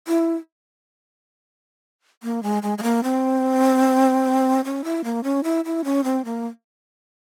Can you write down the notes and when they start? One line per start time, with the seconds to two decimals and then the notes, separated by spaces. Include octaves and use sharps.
0.08 E4
2.23 A#3
2.43 G#3
2.63 G#3
2.78 G#3
2.83 A#3
3.04 C4
4.64 C#4
4.84 E4
5.04 A#3
5.24 C#4
5.44 E4
5.65 E4
5.84 C#4
6.04 C4
6.25 A#3